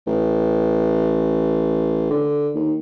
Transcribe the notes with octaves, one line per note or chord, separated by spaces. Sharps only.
A1
D3
D#2